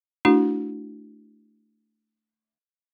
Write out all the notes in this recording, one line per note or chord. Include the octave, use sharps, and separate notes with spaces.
A3 D4 E4 F#4